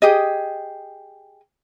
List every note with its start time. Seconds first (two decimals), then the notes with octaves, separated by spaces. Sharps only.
0.02 G4 G#4 D#5